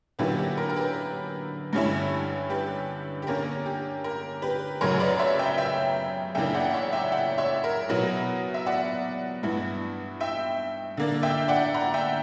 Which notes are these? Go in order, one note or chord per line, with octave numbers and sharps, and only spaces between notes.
D3 F#3 A#3 C#4 E4 G4 B4
G4
A#4
A#4
G4 B4
G2 D3 G3 C#4 E4
G4 B4
G4
D3 A#3 C#4 A#4
G4
A#4
G4 B4
F#2 C#3 F#3 A#4 C#5
B4 D5
C#5 E5
E5 G5
E5 G5
F#2 C#3 E3 A#3 D4 E5 G5
D5 F#5
F#5
C#5 E5
E5 G5
D5 F#5
C#5 E5
A#4
B2 F#3 B3 E4 A#4
E5
D5 F#5
G2 E3 B3 E4
E5 G5
D3 A#3 D4
E5 G5
D5 F#5
F#5 A#5
E5 G5